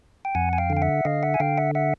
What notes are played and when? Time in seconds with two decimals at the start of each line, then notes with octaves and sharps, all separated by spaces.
0.25 G5
0.35 F2 F#5 G#5
0.53 G#5
0.58 F5 G5
0.70 D3
0.77 G5
0.82 E5 F#5
1.05 D3 D#5 F5
1.23 E5 F#5
1.34 G#5
1.40 D3 F5 G5
1.57 E5 F#5
1.75 E5 F#5